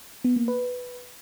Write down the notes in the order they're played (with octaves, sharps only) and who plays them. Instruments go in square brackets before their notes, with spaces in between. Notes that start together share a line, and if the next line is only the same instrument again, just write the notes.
[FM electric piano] B3
A#3
B4